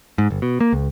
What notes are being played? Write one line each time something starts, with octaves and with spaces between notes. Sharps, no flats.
G#2
G1
B2
A#3
C#2